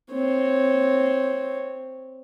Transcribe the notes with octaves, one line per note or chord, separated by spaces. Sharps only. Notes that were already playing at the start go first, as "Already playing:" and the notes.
C4 C#5